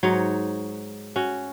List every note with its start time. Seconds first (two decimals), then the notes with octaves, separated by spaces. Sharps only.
0.03 G#2 F#3 D#4 C#5
1.16 C#4 F#4